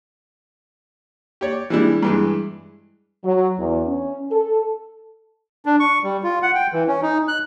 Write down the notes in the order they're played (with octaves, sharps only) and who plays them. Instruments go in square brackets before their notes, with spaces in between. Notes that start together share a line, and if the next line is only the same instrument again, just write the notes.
[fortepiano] G4 C#5 D5
E3 G3 G#3 D4 E4
G2 E3 G#3
[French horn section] F#3
E2
C#4
A4
[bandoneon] D4
C#6
G3
F4
F#5
G5
E3
C#4
D#4
F#6